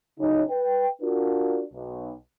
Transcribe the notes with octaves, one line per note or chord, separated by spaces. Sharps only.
A2 C#3 F#3 C#4 D#4
B4 G5
D4 F4 F#4 A#4
B1